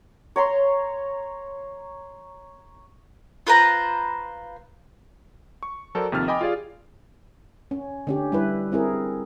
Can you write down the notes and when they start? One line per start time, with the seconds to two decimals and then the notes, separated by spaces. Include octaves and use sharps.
0.36 C#5 A#5 C6
3.47 F4 B4 C5 A#5
5.63 C#6
5.95 F#3 A4 A#4 C5 D5
6.12 D#2 C3 F3 C4 F6 A6
6.28 D#5 G5 G#5 B5 D6
6.41 F4 G4 G#4 D5 F5
7.71 C#4
8.07 D3 C#4 G4
8.32 G3 E4 B4
8.72 C4 E4 G#4 A#4